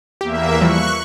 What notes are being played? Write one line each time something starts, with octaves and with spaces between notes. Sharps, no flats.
E2 A#3 G4 E5
E3 F3 G3 C#6 F#6